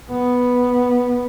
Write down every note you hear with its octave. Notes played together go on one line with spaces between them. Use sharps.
B3